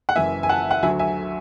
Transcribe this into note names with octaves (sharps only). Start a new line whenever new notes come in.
F#5
F#1 F#2 E3 E5 G#5
G#5
F#5 A5
F#5
D2 D3 F#3 E5 G#5
E5 G#5